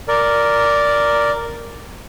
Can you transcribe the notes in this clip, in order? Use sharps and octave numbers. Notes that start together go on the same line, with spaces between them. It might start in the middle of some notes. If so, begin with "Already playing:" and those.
A#4 D5